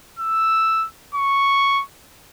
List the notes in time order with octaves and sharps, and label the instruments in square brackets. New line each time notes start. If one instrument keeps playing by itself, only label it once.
[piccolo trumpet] E6
C#6